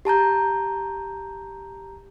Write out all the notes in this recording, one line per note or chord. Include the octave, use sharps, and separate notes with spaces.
G4 A5 A#5 G6